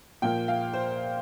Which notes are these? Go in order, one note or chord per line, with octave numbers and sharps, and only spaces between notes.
A#2 F3 A#3 G5
F5
C5